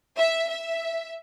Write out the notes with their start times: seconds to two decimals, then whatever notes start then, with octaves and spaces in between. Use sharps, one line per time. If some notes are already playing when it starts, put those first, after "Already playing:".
0.17 E5
0.48 E5